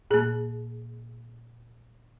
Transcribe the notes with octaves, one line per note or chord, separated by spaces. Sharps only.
A#2 A#3 G#4